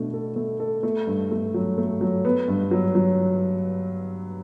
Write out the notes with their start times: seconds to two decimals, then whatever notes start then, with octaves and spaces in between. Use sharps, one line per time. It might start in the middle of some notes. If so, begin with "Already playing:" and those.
Already playing: B2 A3 D4
0.13 A4
0.36 A3
0.60 A4
0.83 A3
1.07 G2
1.31 A3
1.54 F#3
1.78 A3
2.01 F#3
2.25 B3
2.48 G2
2.71 F#3
2.95 F#3